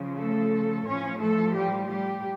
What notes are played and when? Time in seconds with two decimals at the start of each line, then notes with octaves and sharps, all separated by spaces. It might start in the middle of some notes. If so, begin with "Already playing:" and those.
Already playing: C#3 F3
0.17 A3 A4
0.86 A2 F3 C#4 C#5
1.20 A3 A4
1.54 G3 G4
1.89 G3 G4